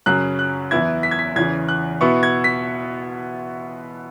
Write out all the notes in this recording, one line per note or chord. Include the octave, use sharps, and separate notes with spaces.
F#2 C#3 F#3 F#6
F#6
E2 E3 B3 E4 G#6
B6
G#6
B6
E2 C#3 E3 G#6
F#6
B2 B3 E4 C#6
G#6
B6